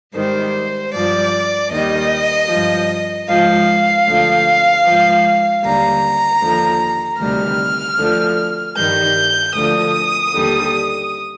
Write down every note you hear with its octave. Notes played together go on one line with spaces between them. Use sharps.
G#2 D#3 G3 C5
G2 F3 D5
D#2 D#3 G3 D#5
G2 F3
G#2 F3 F5
D2 D3 F3
G#2 F3
D#2 D3 G3 A#5
D#2 D3 F3
D2 C3 D#3 G3 F6
D2 D3 F3
G2 D#3 G3 G6
D2 D3 F3 D#6
D#2 D3 G3